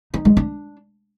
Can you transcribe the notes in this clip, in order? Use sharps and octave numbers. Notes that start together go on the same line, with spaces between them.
D#4
G#3
D4